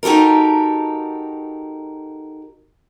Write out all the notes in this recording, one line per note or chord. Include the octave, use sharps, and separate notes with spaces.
D#4 F#4 G4 A4 A#4